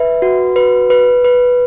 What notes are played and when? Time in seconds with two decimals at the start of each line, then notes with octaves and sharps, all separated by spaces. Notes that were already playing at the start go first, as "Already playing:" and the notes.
Already playing: B4 E5
0.22 F#4
0.56 B4
0.90 B4
1.24 B4